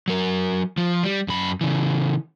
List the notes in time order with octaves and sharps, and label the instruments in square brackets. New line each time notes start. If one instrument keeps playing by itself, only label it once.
[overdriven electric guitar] F#3 A#4
F3
G3
F#2 B5
C#3 E3